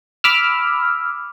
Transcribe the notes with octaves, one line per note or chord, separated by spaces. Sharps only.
B5 D6 E6 F6